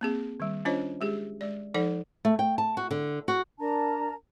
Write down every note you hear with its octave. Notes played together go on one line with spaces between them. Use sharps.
A#3 C4 G#4
D#3 G3
C#4 D4 F4 C5 C#5 D#5
G#3 G4 G#4
G#3 D5
F3 D#4 A4 D5 F#5
A3
G5
A5
F#4
D3
F#4
D4 A#4 A5 A#5